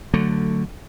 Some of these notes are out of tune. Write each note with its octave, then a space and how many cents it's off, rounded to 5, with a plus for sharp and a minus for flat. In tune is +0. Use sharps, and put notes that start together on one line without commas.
D3 +0 F#3 +0 A3 +15